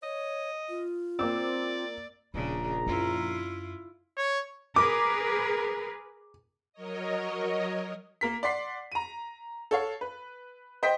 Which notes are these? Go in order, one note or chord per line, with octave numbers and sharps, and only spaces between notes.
C#5 D#5
F4
A#3 C4 D5 D6 E6
D#1 A#1 C#3 D4 A#5
F#2 D4 E4 F4
C#5
G#4 A#4 B4 D6
F#3 A#4 C#5 D#5
A#3 A#4 B6
D5 F#5 C6 B6 C7
A#5 D#7
A4 C#5 F5
B4
C5 D#5 G5 C6 B6